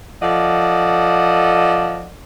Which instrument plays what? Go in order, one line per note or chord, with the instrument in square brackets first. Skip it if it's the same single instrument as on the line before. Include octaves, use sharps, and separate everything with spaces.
[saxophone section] F3 A4 D5 D#5 F#5